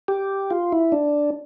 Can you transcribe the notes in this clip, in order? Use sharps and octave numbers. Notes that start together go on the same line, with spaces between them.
G4
F4
E4
D4